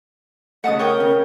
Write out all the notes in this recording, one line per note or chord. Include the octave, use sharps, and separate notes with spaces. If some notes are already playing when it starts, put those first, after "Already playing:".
C#3 A3 D#5 F#5 A5 D#6
A#4 C#5 G5 D#6
C#3 C#4